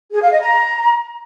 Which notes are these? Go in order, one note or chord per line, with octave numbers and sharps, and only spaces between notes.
G#4
F5
D#5
A#5